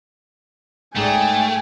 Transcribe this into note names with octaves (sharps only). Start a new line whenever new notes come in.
G#2 A3 G#4 D5 G5 G#5